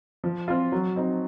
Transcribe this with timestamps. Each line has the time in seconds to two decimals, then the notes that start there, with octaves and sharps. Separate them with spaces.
0.24 F3
0.48 C4 F4
0.72 F#3
0.96 C4 D#4